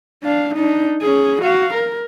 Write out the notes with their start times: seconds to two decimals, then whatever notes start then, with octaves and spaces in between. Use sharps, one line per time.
0.23 D4 F5
0.55 D4 D#4
1.02 C#4 G#4
1.42 F#4 F5
1.74 A#4